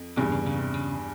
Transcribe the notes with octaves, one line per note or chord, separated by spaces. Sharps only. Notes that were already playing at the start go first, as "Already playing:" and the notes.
Already playing: F2
E2 G2 C3
C#3
C#3
C3
C#3